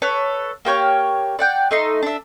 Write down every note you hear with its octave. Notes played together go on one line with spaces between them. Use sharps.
A4 B4 C#5
A#3 G4 C#5 F6
D5 F#5 G5
A3 D#4 C6
D4 E5